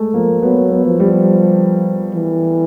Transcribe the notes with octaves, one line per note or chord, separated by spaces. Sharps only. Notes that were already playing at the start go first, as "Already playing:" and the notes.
Already playing: G#3 A3
F3 A#3
F#3 B3
B3
F3
G3
E3